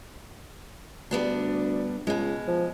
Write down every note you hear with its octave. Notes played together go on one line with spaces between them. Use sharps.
D2 G3 B3 D4
C#2 B2 G#3
F3